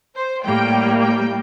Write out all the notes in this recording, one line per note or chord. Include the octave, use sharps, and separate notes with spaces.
C5
A2 G3 A#3 G5
G5